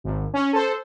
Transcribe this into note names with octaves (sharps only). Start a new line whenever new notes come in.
G#1
C#4
A4 C5